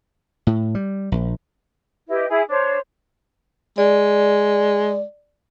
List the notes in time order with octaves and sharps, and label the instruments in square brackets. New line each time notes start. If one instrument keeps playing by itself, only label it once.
[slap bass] A2
G3
A#1
[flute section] E4 G4 B4 D#5
E4 G#4
D4 C5 C#5
[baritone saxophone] G#3 [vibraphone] D5